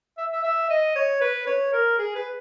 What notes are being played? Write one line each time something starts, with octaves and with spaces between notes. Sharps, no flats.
E5
E5
E5
D#5
C#5
B4
C#5
A#4
G#4
B4